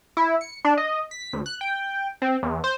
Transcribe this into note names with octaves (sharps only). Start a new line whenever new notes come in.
E4
C#7
D4
D#5
B6
D2
F#6
G5
C4
E2
C5